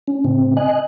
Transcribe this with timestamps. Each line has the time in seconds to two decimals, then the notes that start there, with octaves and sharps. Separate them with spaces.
0.08 C#4
0.25 A2 C#3 C4
0.57 D#5 G#5 F#6